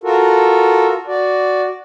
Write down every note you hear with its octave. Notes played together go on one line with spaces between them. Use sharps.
F4 F#4 A4 A#4
F#4 D5